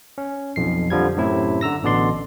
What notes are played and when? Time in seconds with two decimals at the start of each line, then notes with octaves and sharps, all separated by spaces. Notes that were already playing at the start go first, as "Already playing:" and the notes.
0.18 C#4
0.56 B1 F2 C7
0.90 F2 D3 F3 G3 G#6
1.16 F#2 A2 C3 E4
1.61 D3 A#5 E6 A#6
1.83 A1 B2 D3 D5 C6